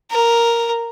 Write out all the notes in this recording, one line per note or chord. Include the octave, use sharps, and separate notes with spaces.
A#4